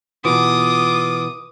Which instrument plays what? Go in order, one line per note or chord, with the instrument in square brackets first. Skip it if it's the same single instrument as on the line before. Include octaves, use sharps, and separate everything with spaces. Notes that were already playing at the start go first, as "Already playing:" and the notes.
[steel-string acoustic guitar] B2 E3 [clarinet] F4 [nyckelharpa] D6 [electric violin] D#6